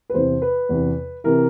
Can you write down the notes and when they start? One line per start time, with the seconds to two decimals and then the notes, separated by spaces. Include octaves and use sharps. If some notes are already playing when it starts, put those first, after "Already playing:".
0.10 B4
0.14 E2 C3 E3 C5
0.42 B4
0.69 E2 C3 E3
1.24 C3 E3 A#4